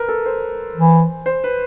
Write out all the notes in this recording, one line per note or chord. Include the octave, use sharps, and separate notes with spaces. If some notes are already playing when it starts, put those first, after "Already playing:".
Already playing: A#4 B4
A4
C5
E3
C5
B4